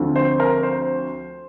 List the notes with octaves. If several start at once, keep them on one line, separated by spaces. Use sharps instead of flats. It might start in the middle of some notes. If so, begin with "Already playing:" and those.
Already playing: D2 D3 F3 C4
C5
A#4
C5